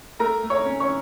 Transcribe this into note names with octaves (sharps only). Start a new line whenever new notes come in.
A3 A#4 A#5
A3
C#5 C#6
C#4
C#5 C#6